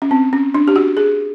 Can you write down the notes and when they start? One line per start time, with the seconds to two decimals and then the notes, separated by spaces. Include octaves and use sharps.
0.02 C#4
0.11 C4
0.33 C#4
0.54 D4
0.68 G4
0.76 F#4
0.97 G#4